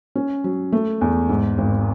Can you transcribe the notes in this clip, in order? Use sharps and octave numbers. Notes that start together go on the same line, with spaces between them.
C#4
F#3
A3
E2
G#2
G#1